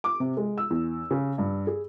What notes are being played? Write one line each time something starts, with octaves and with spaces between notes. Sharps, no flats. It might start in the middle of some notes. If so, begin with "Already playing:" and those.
D6
C3
G#3
E6
E2
C#3
G2
G#4